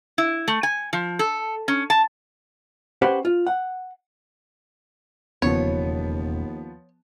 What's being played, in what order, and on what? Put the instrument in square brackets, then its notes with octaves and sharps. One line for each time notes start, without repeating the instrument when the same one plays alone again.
[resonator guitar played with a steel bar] E4
A3
G#5
F3
A4
C#4
A5
[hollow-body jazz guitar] C#4 G4 B4 C5 F#5
F4
F#5
[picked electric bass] E1 C#3 [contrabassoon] D#2 [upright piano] F3 B3 [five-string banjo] C#5